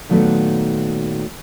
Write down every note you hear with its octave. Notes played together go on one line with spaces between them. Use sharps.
A#2 D#3 F#3 A3 B3